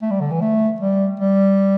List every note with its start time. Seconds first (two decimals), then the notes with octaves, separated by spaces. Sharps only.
0.02 A3
0.11 G3
0.21 D3
0.31 E3
0.41 A3
0.81 G3
1.20 G3